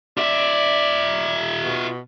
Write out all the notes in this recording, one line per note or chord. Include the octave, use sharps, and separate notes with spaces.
F4 D5 E5
B2